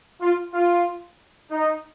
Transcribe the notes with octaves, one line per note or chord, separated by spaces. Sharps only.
F4
F4
D#4